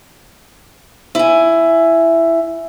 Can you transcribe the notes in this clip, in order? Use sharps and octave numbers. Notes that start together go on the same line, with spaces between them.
E4 G#5